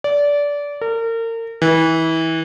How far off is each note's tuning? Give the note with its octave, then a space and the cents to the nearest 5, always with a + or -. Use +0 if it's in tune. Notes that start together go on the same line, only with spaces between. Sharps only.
D5 -20
A#4 -35
E3 -25